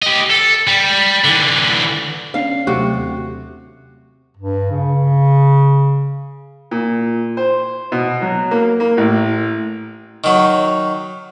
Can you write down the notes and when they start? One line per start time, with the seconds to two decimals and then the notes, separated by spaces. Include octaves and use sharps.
0.02 G4 D#5
0.30 A4
0.67 G3
1.25 D3 E3
2.34 B3 C#4 D4 F5
2.67 D#2 C3 F#3 A3 F#4
4.37 G2
4.71 C#3
6.71 A#2
7.37 C5
7.92 B2
8.22 F#3
8.51 A#3
8.80 A#3
8.97 A1
10.24 D#3 F#3